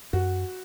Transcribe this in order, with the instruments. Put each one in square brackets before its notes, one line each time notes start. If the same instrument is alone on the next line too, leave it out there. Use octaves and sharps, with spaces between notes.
[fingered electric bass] F#2 [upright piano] F#4